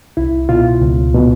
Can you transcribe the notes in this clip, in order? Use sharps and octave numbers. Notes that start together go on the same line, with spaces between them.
C2 E4
B2 F4
C#2
B2